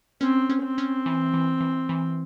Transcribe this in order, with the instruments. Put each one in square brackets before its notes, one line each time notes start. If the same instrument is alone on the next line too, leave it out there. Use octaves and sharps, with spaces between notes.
[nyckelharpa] C4 [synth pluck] C#4
[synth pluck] C#4
[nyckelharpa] C4
[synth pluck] C#4
E3
E3
E3
E3